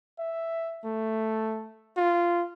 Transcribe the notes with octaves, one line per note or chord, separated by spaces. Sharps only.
E5
A3
F4